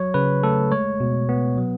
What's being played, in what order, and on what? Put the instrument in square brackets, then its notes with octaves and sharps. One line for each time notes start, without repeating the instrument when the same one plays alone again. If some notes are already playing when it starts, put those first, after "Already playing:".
Already playing: [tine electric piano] F#3 C#5
C#3 B4
A3 A4
G#3 C#5
B2
B3
F#3